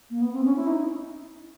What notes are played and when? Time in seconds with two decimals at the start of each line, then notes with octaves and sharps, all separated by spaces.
0.10 A#3
0.21 B3
0.33 C4
0.44 C#4
0.56 E4
0.67 D#4